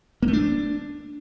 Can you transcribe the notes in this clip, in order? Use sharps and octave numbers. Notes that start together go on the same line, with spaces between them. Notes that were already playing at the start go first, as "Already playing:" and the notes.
A#3
A3
D4